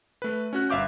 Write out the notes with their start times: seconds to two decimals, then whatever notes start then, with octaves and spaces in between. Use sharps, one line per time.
0.22 A3 B4
0.53 C#4 F#4 F#6
0.70 G1 E5 F5 D6 G6